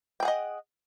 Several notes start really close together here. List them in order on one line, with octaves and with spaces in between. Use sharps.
G5 G#4 F#5 D#5